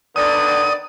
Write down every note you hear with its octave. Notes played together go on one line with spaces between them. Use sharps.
D3 D#3 B3 D5 D#6